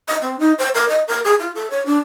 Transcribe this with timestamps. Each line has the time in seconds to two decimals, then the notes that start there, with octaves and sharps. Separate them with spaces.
0.08 D#5
0.22 C4
0.39 D#4
0.58 C5
0.75 A#4
0.89 D#5
1.08 A#4
1.24 G#4
1.40 F4
1.55 A4
1.70 C#5
1.86 D4